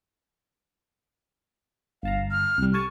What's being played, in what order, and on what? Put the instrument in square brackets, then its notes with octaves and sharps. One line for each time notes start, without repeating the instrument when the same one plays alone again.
[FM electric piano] G1 A5 A#5 [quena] F5
[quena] F6
[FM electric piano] C2 G3
[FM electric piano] A4 G#5 A5 [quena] C#6